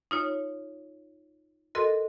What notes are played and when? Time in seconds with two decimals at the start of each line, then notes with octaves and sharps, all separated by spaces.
0.11 D#4 F4 C#5
1.75 F#4 A4 A#4 D#5 C6